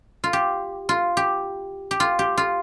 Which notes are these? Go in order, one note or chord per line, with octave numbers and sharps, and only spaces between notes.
F4
G4
F4
G4
G4
F4
G4
F4